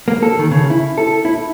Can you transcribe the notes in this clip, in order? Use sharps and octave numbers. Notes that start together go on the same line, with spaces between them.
A#3
A4
D#3
C#3
E4
A4
E4